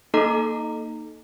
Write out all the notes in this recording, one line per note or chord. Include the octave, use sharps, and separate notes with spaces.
A#3 D#4 A4 D#5 A#5 D6